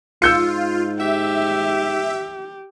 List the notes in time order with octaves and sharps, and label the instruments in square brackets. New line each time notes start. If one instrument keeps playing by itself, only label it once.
[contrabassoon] G#2 [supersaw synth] F4 [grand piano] E6 G6 C#7
[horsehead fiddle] G4 [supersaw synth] E5